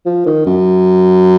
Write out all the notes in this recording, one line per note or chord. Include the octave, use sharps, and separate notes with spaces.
F3
D#3
F#2